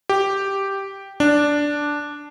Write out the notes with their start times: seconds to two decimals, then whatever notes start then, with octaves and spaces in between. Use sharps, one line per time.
0.09 G4
1.20 D4